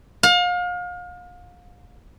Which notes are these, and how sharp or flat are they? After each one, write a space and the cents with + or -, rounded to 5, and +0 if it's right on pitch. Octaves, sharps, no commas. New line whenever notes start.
F5 +35